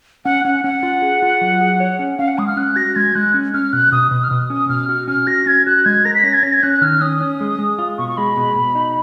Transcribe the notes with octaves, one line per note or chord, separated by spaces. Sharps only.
C#4 F#5
C#4 F#5
C#4 F#5
F4
G#4
F4
F#3
G#4
C#5
C#4
C#4 F5
F#5
G#3 D#6
F6
C#4 F#6
F#4 A#6
G#3 G#6
G#3 F#6
C#4
C#4 F6
B2 F#6
B2 D#6
B2 D#6
F6
B2 D#6
C#4 D#6
B2 F6
F#4 F6
C#4 F6
F#4 A#6
C#4 G#6
F#4 F#6
G#3 G#6
A#4 A#6
B6
C#4 A#6
G#6
C#4 A#6
G#6
C#4 F#6
F#6
D#3 F6
C#4 D#6
C#4
G#3
G#3
F4
B2 C#6
C#6
G#3 B5
B2
B2
D#4